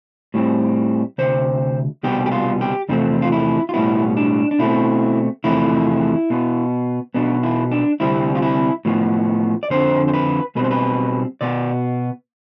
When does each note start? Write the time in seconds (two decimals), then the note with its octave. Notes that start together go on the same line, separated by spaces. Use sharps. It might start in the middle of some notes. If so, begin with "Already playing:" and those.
0.34 A2 G3 C4
1.18 D2 C3 C5
2.03 C2 B2 G3 B3 G4
2.26 G4
2.32 F4
2.61 G4
2.89 E2 C3 F3 A3 C4 D4
3.22 F4
3.32 E4
3.69 F4
3.74 B1 A2 G3 B3 E4
4.17 D4
4.51 D4
4.59 B2 A3 C4 E4
5.44 E2 C3 F3 A3 E4
6.30 B2 B3
7.14 B1 B2 B3 D4
7.43 E4
7.71 D4
8.00 D2 C3 G3 C4 E4
8.35 F4
8.42 E4
8.85 A2 F3 B3
9.63 D5
9.70 F2 D3 F3 C4 C5
10.08 C5
10.13 B4
10.55 B1 B2 G3 C4 B4
10.64 C5
10.71 B4
11.41 B2 B3 D5